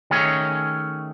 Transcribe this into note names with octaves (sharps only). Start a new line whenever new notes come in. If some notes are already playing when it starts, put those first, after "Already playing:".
D#3 A3 C#4 G#4 C#5